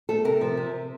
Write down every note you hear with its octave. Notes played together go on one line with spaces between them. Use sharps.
A3 A4
C3 A#4
F3
C3